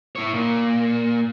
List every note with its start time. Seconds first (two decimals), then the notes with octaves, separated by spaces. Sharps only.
0.16 E4 C#5
0.33 A#2